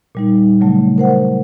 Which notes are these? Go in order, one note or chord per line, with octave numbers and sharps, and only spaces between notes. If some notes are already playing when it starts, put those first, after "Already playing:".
A#2 G3 D#4
C#3 F#3 A3
A#4 C5 F#5